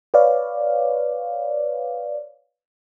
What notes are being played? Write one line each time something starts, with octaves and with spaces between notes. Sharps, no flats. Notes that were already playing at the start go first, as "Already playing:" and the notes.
B4 C#5 D5 F5